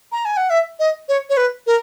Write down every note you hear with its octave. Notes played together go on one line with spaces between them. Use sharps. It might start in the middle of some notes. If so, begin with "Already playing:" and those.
A#5
G#5
F#5
E5
D#5
C#5
C#5
B4
A#4